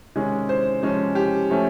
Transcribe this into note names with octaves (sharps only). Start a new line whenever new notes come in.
C3 D#3 G#3 C#4
C5
C3 F3 G#3 C#4
G4
F3 A3 C#4